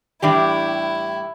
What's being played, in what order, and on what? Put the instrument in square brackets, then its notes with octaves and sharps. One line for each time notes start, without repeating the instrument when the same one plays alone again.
[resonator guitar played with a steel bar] A2 E3 G3 D4 G4 [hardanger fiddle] E4